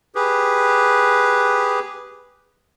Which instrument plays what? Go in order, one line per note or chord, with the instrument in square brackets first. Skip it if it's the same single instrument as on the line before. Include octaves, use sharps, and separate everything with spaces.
[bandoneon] G4 G#4 B4